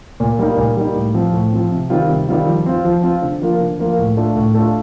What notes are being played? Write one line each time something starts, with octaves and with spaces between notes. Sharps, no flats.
A#2
G3 A#3 D#4
A#2
G3 A#3 D#4
A2
F3 C4
A2
F3 C4
C3
D#3 G3 C4 F4
C3
D#3 G3 C4 F4
F3
C4 F4
F3
C4 F4
D3
F3 A#3 F4
D3
F3 A#3 F4
A2
A3 D4 F4
A2
A3 D4 F4